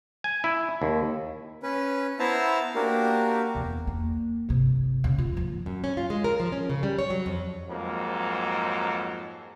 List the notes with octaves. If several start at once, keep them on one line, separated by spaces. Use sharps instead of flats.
G#5
E4
D#2
C#4 B4
B3 E4 C5 E5 A5 A#5
A#3 D4 F#4 G4 A#4
E2
A#3
G1 C3
E2 C#3
F4
E3 F3
F#2
C#4
F4
G#3
A#4
F3
C#4
C#3
G3
C#5
F#3
F2
F2 G#2 F#3 A#3